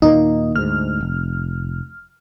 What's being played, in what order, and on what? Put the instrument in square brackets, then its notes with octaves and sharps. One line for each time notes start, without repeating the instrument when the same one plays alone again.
[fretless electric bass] D#2 A#2 A#3 [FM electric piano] D#4
[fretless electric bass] D2 G#2 [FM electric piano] F6
[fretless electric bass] F1